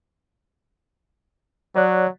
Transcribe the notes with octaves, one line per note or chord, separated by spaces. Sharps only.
F#3 C#5 D5 F#6